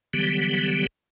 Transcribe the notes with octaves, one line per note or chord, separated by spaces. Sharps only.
D3 E3 F#3 G3 B3 G4